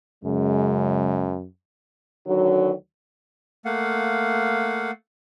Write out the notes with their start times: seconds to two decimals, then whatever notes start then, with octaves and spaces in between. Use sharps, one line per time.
0.24 F#2 C#3 G#3
2.26 D2 D3 D#3 F#3
3.65 A3 A#3 F5 F#5